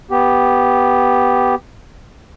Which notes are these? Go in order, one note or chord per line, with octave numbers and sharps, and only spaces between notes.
B3 G4